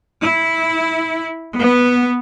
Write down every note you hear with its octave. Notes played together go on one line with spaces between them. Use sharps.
E4
B3